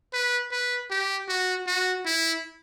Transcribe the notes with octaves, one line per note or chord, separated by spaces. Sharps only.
B4
B4
G4
F#4
F#4
E4